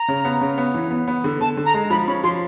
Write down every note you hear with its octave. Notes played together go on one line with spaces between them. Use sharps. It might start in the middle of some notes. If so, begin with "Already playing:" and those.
Already playing: A#5
C#3
B3
C#3
B3
E3
B3
B3
D3
D3 A5
D3
A#5
G#3
F3 B5
C#4 B5
F3 C6